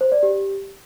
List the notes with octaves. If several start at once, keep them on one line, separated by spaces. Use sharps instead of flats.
C5
D5
G4